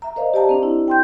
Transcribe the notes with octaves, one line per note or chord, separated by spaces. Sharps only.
E5 A#5
A#4 C5 D5 D#5 F5
G4 D5 A5 A#5
C4 D4
E4
G5 C6 G6